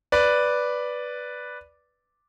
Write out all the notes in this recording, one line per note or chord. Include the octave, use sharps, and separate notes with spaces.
B4 D5